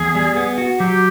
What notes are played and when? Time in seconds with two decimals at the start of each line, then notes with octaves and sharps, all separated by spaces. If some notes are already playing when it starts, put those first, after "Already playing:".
Already playing: E2 G#4
0.15 G3
0.36 B3
0.58 F#4
0.80 F#3 G4